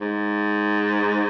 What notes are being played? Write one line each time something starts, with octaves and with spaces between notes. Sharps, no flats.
G#2